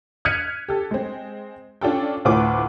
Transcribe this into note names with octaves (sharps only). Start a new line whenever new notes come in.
F6 F#6 G#6 B6 C#7 D#7
G4 A4
G#3 C4
C#4 D4 F4 A4 G5
D2 A2 F4 B4 C5 D6